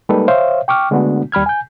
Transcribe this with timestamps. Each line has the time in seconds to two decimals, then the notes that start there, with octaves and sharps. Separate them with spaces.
0.09 G3 G#3 A#3 D#4 A4 B4
0.28 C5 C#5 E5 F5
0.68 G5 C#6 D6 F6
0.91 D3 G#3 A3 B3 D4 F#4
1.32 D#2 G3 B5 F6 G#6
1.46 G#5 G6